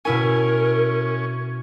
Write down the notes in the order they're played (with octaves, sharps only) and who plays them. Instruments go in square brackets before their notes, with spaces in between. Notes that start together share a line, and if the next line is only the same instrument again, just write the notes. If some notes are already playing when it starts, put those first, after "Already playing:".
[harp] B2 E4 G#5 [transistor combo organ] C#4 [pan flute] A#4